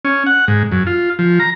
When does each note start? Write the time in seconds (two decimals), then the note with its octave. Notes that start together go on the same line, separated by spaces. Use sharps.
0.05 C#4
0.26 F#5
0.48 G#2
0.72 F#2
0.87 F4
1.19 F3
1.40 A#5